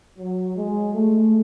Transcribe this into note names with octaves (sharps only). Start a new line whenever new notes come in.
F#3
G#3
A3